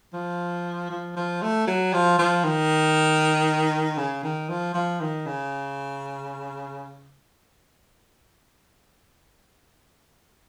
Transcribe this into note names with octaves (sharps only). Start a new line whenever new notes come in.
F3
F3
F3
A3
F#3
F3
F3
D#3
C#3
D#3
F3
F3
D#3
C#3